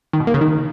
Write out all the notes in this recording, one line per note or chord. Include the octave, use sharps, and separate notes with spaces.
D#3
B2
A#3
C#3
D#3